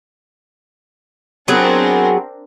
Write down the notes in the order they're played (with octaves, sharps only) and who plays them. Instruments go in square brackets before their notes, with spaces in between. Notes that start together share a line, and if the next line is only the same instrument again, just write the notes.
[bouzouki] F#3 B3 G#4 [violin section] C4 D4 A#4